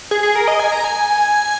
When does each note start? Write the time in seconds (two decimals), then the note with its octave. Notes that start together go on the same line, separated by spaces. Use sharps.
0.11 G#4
0.23 G#4
0.36 A#4
0.48 D#5
0.60 G#5
0.72 A#5
0.84 G#5